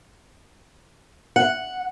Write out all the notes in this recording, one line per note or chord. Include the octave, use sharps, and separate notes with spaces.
F#5